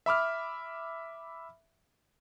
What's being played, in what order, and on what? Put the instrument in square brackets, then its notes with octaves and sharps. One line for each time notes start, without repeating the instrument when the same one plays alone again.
[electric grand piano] E5 B5 D6 F6